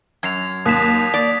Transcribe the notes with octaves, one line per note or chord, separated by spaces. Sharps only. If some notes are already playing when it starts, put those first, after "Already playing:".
F#2 G#6 C7 F7
D#2 D#6 B6 E7
D5